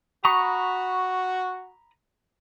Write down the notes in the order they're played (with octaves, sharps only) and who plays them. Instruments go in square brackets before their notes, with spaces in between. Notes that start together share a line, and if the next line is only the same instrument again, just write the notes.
[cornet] F#4 [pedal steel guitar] A#5 B5 D#6 [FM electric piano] C#6